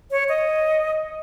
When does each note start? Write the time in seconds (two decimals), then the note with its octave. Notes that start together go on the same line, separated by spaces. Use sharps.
0.11 C#5
0.29 D#5